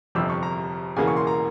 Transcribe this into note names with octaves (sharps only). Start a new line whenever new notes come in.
G1 F2 C3 F3 E6
C#6
A#5
E1 E2 C#3 E3 A#3 G#5
C#6
C6
A#5